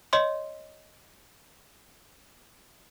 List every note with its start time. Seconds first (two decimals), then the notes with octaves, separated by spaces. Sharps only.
0.13 C#5 D#5 C6